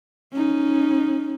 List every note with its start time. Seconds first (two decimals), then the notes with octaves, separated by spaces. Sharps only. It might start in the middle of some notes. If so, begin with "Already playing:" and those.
0.33 C#4 D#4